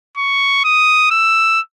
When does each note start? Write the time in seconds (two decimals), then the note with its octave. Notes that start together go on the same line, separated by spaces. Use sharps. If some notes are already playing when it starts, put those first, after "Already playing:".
0.17 C#6
0.64 D#6
1.11 E6